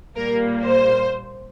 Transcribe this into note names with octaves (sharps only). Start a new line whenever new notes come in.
A#2 G3 A#3 A#4
C5